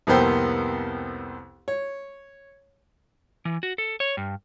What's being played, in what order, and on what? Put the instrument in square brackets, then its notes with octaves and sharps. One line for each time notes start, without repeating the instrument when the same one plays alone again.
[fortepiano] C2 F2 A#3 B3 C5 G5
C#5
[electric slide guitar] E3
F#4
A4
C#5
G2